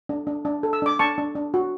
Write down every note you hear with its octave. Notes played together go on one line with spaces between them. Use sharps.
D4
D4
D4
A4
E6
D4 D6
D4 A5 C#6
D4
D4
F#4